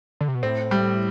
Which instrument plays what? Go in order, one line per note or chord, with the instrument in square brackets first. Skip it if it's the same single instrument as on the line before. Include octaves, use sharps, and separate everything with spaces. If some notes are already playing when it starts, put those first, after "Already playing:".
[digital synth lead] D3
C3
B2
[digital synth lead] A2 [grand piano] C4
[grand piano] G3